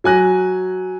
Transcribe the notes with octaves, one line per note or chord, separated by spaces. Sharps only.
F#3 G#5 F#6 A#6